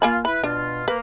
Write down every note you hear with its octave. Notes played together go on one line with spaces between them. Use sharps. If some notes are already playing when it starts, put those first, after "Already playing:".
A#3 F4 G#5 B5
E4 B4 B5
B2 D4 F4
A#3 B4